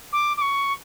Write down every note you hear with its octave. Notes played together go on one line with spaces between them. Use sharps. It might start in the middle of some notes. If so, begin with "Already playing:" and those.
D6
D6
C#6